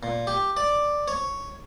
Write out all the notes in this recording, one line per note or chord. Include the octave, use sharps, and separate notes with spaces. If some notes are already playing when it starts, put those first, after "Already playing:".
A#2
G4
D5
C#5